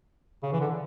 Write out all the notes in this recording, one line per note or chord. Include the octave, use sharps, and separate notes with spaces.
C#3
E3
D3